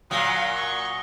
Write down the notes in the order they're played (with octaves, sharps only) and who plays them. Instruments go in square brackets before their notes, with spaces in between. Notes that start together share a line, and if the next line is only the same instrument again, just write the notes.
[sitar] A#2 F#3 [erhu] F5 [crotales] D#6 A#6 G7
[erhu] C#6